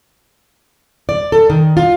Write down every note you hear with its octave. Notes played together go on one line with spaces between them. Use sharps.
D5
A4
D#3
F4